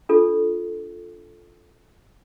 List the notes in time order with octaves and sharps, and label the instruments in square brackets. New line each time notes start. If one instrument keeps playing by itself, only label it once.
[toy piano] D4 F4 A4